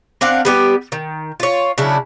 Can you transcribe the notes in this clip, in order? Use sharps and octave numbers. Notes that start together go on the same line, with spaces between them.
C4 D4 F5 F#5
G3 B3 G4
D#3
F4 C#5
C#3 F#3 D4 E4